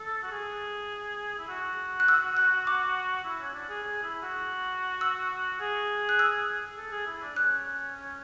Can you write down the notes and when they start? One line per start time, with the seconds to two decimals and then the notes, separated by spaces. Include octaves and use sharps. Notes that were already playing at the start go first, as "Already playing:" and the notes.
Already playing: A4
0.22 F#4
0.31 G#4
1.38 E4
1.49 F#4
2.00 F#6
2.08 E6
2.37 F#6
2.67 D6
3.25 E4
3.40 C#4
3.54 D4
3.69 G#4
3.83 G#4
4.03 E4
4.23 F#4
5.01 E6
5.60 G#4
6.09 F#6
6.19 E6
6.78 A4
6.92 G#4
7.07 E4
7.22 D4
7.36 C#4 F#6